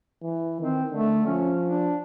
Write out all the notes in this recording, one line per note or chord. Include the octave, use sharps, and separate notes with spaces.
E3
D#3 C4
D3 A3
F3 C#4
D4